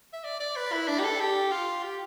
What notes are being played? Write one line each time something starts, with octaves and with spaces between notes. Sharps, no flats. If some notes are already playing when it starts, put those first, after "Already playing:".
E5
D5
D5
B4
E4
D4
G4
A4
G4
F4
G4